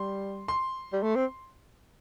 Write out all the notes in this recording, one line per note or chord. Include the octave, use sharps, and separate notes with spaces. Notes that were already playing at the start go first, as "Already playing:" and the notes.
Already playing: G3 C6
C6
G3
A3
C4